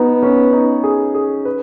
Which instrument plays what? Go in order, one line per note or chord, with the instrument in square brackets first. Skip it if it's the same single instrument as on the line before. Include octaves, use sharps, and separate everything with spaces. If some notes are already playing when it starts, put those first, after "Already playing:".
Already playing: [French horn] B3 [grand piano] D#4 F#4
[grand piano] C#4
D#4
G#4
G#4
B4